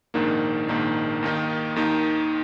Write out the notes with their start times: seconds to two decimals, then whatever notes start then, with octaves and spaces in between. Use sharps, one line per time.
0.14 A#1 G#2 D#3 A#3 D4
0.69 A#1 G#2 D#3 A#3 D4
1.23 D#2 D#3 A#3 D#4
1.76 D#2 D#3 A#3 D#4